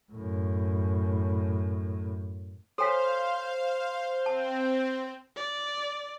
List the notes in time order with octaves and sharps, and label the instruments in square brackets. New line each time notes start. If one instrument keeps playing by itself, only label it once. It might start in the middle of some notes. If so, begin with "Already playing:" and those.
[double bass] F#2 A2
[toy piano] A4 C#5 G#5 [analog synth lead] C5 [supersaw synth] F5 [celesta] C6 B6
[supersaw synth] C4 [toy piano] A5
[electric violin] D5